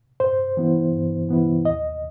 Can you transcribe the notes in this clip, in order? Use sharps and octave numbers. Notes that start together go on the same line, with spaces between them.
G2 C5
E3 B3 E4
G2
E3 B3 E4
D#2 D#5